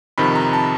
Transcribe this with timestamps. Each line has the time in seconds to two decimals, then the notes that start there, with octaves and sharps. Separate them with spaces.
0.18 F2 C3 D#3 B5
0.35 A#5
0.53 A5